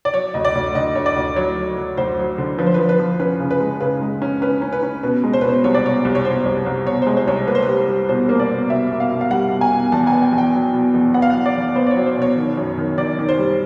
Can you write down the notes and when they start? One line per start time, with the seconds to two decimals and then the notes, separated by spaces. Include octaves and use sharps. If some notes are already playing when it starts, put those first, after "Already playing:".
0.05 D5
0.14 F#3 C#5
0.34 D2 D#5
0.45 D5
0.55 D2
0.75 D3 D#5
0.95 D2 C#5
1.06 D5
1.16 D2
1.36 F#3 C#5
1.57 F#3
1.77 F#3
1.97 D2 C5
2.18 F#3
2.38 D3
2.59 F3 B4
2.66 C5
2.74 B4
2.79 F3
2.89 B4
2.99 F3
3.19 C#4 B4
3.40 C#3
3.51 B4
3.60 G#3
3.80 C#3 B4
4.01 G#3
4.22 C#4
4.42 C#4 B4
4.62 C#4
4.73 B4
4.83 C#4
5.03 B2 B4
5.23 G#3
5.33 C5
5.41 B4
5.44 B2
5.49 C5
5.64 C2 C#5
5.75 D5
5.84 B2 C#5
6.05 C2
6.15 C#5
6.25 B2 C5
6.45 C2
6.66 C2
6.87 B2 C#5
7.02 C5
7.07 G#3
7.17 C5
7.27 C2 C#5
7.32 C5
7.48 A#3 B4
7.55 C5
7.63 B4
7.68 G3
7.88 G3
8.09 B2 C5
8.29 A#3
8.39 D5
8.50 B2
8.70 B2 E5
8.91 B2
9.00 F5
9.11 B2
9.21 F5
9.31 G3 F#5
9.51 B2
9.61 G#5
9.72 B2
9.92 E2 A5
10.07 G#5
10.12 B3
10.22 G5
10.33 E2
10.38 G5
10.53 F#3
10.74 B2
10.94 E2
11.14 B3 F#5
11.22 F5
11.30 F#5
11.35 F#3
11.46 D5
11.55 E2
11.76 B3 C5
11.87 D5
11.91 C#5
11.96 F#3
12.06 C5
12.16 B2
12.22 C#5
12.37 D#3
12.57 F#2
12.78 D#3
12.98 D#3 D5
13.19 D#3
13.29 C5
13.38 G3